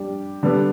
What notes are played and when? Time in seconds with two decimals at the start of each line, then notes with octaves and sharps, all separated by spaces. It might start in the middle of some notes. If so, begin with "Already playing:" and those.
Already playing: G3 D4 G4
0.43 D3 G3 B3 D4